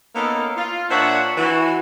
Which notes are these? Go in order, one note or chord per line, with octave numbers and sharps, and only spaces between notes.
A#3 B3 C#4 D#4 A4 F5
F4
A#2 D4 C5 C#5 E5 F#5
E3 F#4